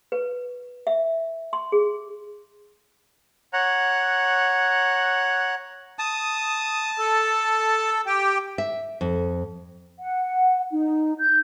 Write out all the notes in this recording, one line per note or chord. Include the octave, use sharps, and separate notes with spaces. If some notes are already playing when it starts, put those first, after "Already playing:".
B4
E5
C6
G#4
C#5 F#5 A#5 F#6
A5 D#6
A4
G4 G5
E5
F2
F#5
D#4
G6